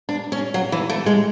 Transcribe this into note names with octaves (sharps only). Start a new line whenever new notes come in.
D4
C#4
F#3
E3
A3
G#3